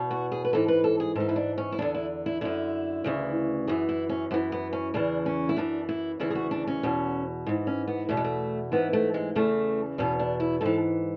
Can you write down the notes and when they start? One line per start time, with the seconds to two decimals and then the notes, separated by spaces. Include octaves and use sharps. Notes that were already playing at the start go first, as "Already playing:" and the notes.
Already playing: E2 B2
0.11 F#4
0.32 G#4
0.45 B4
0.53 G#2 E3 A4
0.68 B4
0.84 A4
1.00 G#4
1.15 G#2 E3 A4
1.29 E4
1.36 D4
1.58 C#4
1.72 E4
1.79 E2 D3 D4
1.95 E4
2.26 E4
2.41 F#2 D3 E4
3.04 D2 C#3 E3
3.67 F#2 E3 G#4
3.89 E4
4.09 C#4
4.31 F#2 E3 B3
4.52 B3
4.73 C#4
4.94 E2 C#3 E3 D4
5.26 C#4
5.49 E4
5.57 F#2 E3 D4
5.89 E4
6.20 D2 C#3 E3 E4
6.30 G#4
6.35 F#4
6.51 D4
6.67 C#4
6.83 E2 B2
7.46 G#2 E3
7.67 C#4
7.87 B3
8.09 E2 B2 A3
8.17 G#3
8.24 A3
8.72 G#2 E3 B3
8.93 A3
9.14 G#3
9.35 E2 C#3 E3 A3
9.98 E2 B2 C#4
10.19 D4
10.40 E4
10.61 G#2 E3 A4